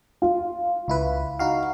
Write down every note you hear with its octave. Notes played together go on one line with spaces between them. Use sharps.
F4
C#2 E4 B4
D#4 F#4 F5